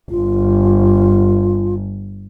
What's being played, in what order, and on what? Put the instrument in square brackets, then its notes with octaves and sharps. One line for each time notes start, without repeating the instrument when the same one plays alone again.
[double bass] G1 [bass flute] F4